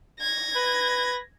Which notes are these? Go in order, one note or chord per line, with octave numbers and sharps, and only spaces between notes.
G#6 A#6
B4